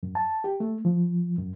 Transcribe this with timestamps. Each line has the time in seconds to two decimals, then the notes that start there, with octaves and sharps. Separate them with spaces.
0.03 F#2
0.15 A5
0.44 G4
0.60 A3
0.85 F3
1.38 F#2